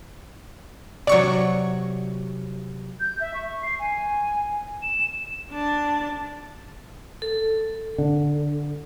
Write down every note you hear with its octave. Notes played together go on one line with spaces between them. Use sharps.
C3 F#3 D5 C#6
G6
E5
C#6
C7
G#5
E7
D4 A5
A4
D3